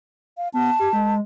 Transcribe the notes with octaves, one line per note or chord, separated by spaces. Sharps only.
F5
B3 A5
G4
G#3